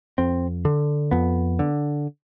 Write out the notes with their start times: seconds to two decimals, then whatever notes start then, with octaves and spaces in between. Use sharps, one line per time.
0.18 F2 C4
0.65 D3
1.11 F2 B3
1.59 D3